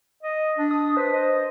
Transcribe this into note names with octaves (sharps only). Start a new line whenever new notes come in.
D#5
D4
D#6
B4 C5
D#5